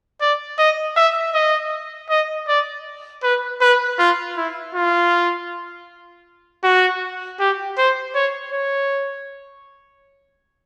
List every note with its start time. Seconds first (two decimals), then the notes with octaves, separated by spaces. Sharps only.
0.21 D5
0.59 D#5
0.97 E5
1.34 D#5
2.10 D#5
2.48 D5
3.23 B4
3.61 B4
3.99 F4
4.37 E4
4.75 F4
6.64 F#4
7.40 G4
7.78 C5
8.15 C#5
8.53 C#5